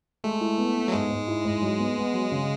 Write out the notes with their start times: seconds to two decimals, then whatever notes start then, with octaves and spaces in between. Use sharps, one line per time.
0.24 G#3 A3
0.41 E4
0.58 B3
0.75 B3
0.88 F#3
0.92 G#2 G#3
1.10 G#2
1.28 E4
1.45 G#2
1.62 F#3
1.79 B3
1.97 B3
2.14 F#3
2.31 C#3